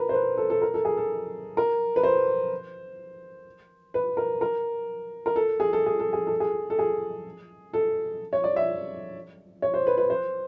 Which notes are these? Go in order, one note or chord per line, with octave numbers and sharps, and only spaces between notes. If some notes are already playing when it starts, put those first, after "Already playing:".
Already playing: A#4 B4
C5
B4
A4
A4
A#4
A4
G#4
A4
A#4
B4
C5
B4
A#4
A#4
A#4
A4
G#4
A4
G#4
A4
G#4
A4
G#4
A4
G#4
A4
C#5
D5
E5
C#5
C5
B4
B4
C5